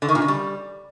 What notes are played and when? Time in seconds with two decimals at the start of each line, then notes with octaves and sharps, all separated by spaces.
0.02 D3
0.09 D#3
0.15 A#2
0.22 C#3
0.28 G3